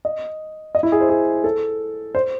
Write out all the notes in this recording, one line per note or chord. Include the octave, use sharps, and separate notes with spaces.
D#5
D#5
E4
G#4
C5
G#4
A4
C5